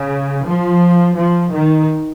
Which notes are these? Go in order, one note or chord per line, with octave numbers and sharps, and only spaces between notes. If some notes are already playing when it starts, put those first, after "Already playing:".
Already playing: C#3
F3
F3
D#3